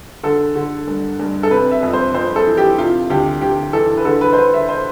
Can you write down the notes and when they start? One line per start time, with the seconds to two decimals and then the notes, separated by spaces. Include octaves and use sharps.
0.23 D3 A4
0.56 D3
0.87 G2
1.19 G2
1.43 A4
1.50 C3 B4
1.71 E5
1.83 F2
1.93 C5
2.14 F2 C5
2.36 A4
2.47 E3
2.57 G4
2.78 C3 F4
3.10 D2 G4
3.41 D2 G4
3.73 E3 A4
3.97 B4
4.05 D3 A4
4.21 B4
4.33 C5
4.37 D3 B4
4.54 E5
4.69 C5